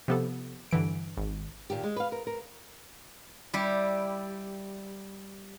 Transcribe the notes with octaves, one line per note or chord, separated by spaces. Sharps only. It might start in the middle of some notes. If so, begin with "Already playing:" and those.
C3 F3 B3 G4 A4
G2 D3 E3 D7
G#1
A#2 D#3 G4
G#3
B4 F5
A#4
A#4
G3 E4 G4